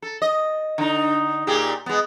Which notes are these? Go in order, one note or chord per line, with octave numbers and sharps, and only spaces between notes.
A4
D#5
D3 D#4
A#2 G4 G#4
G#3 B3